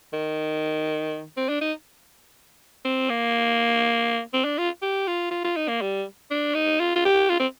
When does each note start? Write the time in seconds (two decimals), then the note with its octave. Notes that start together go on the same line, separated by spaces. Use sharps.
0.13 D#3
1.37 C4
1.49 D4
1.61 D#4
2.85 C4
3.09 A#3
4.33 C4
4.45 D4
4.58 F4
4.82 G4
5.07 F4
5.31 F4
5.44 F4
5.56 D#4
5.68 A#3
5.82 G3
6.30 D4
6.54 D#4
6.80 F4
6.96 F4
7.05 G4
7.29 F4
7.39 C4